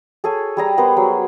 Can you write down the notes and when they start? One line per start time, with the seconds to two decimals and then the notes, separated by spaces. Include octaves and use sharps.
0.24 G#4 A4 C#5 G#5
0.57 G3 G#4 A#5
0.78 B3 A#4 C5
0.97 F#3